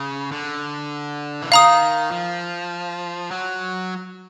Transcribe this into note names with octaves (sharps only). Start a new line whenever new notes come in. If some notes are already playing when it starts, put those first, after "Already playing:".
Already playing: C#3
D3
E3
D#3 F5 A#5 D#6
F3
F#3